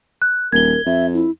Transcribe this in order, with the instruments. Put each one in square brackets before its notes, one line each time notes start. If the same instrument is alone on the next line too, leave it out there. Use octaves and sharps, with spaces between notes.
[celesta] F#6
[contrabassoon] D#1 [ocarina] A#4 [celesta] G#6 G7
[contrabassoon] F2 [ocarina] E5
[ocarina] E4